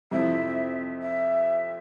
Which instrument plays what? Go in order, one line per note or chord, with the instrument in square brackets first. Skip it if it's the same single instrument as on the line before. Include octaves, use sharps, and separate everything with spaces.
[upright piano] F2 C3 F3 C4 E4 [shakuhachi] E5
[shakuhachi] E5